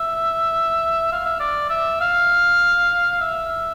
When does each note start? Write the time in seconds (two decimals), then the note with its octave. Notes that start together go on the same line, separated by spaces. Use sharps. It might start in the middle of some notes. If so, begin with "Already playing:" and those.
Already playing: E5
1.12 F5
1.26 E5
1.40 D5
1.70 E5
2.01 F5
3.21 E5